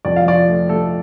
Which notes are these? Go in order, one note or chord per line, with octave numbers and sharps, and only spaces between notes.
F2 D5
F5
F3 D5
A3
A3 A4